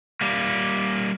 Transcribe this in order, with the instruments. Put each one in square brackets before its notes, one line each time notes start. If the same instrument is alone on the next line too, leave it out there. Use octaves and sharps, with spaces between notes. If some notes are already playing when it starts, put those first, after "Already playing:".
[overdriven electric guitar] G3 A#3